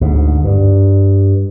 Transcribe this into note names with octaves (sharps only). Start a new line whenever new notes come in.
D2 G#2
G2